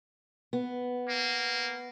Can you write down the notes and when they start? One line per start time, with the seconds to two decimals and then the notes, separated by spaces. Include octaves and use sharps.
0.53 B3
1.08 A#3